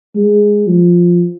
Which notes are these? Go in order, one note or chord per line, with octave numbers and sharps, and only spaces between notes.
G#3
F3